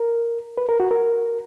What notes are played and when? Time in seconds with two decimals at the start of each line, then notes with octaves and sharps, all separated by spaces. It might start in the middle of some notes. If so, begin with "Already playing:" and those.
Already playing: A#4
0.57 B4
0.69 A#4
0.80 F#4
0.91 A#4